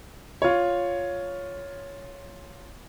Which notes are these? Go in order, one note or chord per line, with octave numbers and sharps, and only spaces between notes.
F4 C#5